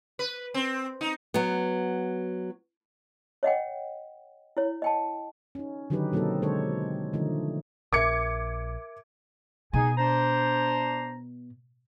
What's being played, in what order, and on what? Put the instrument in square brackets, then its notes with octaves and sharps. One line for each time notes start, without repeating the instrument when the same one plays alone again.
[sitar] B4
C4
D#4
[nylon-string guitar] F#3 B3
[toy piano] C#5 D#5 F#5 G5
E4 C#5
D#5 G5 A5
[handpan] C#4 D#4
D3 D#3 F#3 D#4 G4 B4
B2 F#3 A#3 C4 D#4 A4
D3 G#3 D4 A4 C5 C#5
D3 D#3 F3 A3 D#4
[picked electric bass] A#1 [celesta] A#4 E5 [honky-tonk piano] D6 G#6 C#7
[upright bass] B2 [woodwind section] D#4 G#4 G#5
[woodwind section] D4 C5 A#5